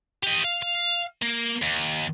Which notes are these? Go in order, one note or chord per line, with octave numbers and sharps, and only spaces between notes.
G4 D#5
F5
F5
A#3
D#2